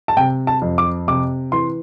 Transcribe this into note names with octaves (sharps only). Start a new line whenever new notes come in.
A5
C3 G5
A5
F2
D6
C3 D6
E3 C6